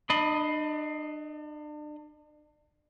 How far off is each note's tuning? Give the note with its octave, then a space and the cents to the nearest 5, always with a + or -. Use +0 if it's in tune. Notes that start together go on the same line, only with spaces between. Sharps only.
D4 +40 D#5 +5 B5 +0